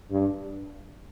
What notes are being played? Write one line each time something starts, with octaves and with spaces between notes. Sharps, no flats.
G2